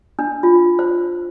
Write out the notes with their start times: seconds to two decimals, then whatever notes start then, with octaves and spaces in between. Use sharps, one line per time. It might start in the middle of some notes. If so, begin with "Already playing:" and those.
0.19 D4
0.43 F4
0.79 C5